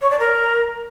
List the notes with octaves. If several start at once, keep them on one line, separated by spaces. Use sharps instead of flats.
C#5
D5
A#4